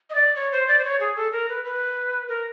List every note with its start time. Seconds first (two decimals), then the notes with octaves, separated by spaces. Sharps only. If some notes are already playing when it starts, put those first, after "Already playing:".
0.10 D#5
0.15 D5
0.36 C#5
0.52 C5
0.68 D5
0.79 C5
0.84 C#5
1.00 G#4
1.16 A4
1.32 A#4
1.49 B4
1.65 B4
2.29 A#4